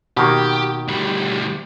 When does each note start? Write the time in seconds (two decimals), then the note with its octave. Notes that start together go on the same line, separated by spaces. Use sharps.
0.17 B2 D#3 A#3 G4
0.88 D2 G3